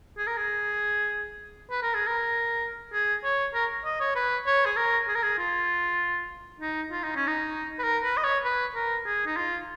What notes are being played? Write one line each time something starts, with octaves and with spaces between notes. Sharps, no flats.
G#4
A#4
G#4
B4
A#4
G#4
A#4
G#4
C#5
A#4
D#5
C#5
B4
C#5
G#4
A#4
G#4
A#4
G#4
F4
D#4
F4
D#4
C#4
D#4
B4
A#4
B4
D#5
C#5
B4
A#4
G#4
D#4
F4